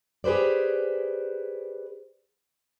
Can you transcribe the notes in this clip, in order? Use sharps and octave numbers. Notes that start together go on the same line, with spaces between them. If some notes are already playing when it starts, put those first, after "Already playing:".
G4 G#4 B4 C5 D5